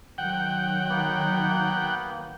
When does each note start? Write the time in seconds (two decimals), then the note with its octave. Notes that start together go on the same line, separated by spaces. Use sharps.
0.18 D#3 F#3 F#5 G5
0.89 A#3 B3